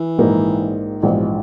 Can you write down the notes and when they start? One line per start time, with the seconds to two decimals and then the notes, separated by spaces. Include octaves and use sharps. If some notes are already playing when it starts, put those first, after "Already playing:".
Already playing: E3
0.18 A#1 G#2 D#3 A#3 D#4
1.03 A#1 G#2 B2 E3